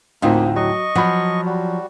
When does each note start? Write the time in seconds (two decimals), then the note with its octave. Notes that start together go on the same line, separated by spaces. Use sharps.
0.22 D2 A2 A#3 C4 D#4 F4
0.56 F#3 D#5 C#6
0.95 F3 F#3 F#5 B5
1.46 G3 F#4